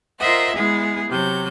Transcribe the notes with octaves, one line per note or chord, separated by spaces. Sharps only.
F4 A#4 C5 D#5 E5 F#5
G#3 B3 E4 G#4
C3 F#3 G6